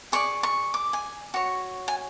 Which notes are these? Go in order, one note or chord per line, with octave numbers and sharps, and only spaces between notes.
G#4 D5 C#6
C#6
D6
G#5
F#4 C#5
G#5